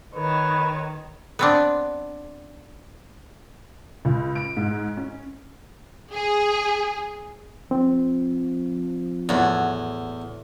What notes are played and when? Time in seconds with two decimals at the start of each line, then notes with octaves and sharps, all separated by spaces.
0.15 D#3 B4 C#5
1.39 B3 C4 D4
4.05 C#2
4.35 D7
4.57 G#2
4.97 C#4
6.13 G#4
7.71 F3 C4
9.29 E2 A2 F#3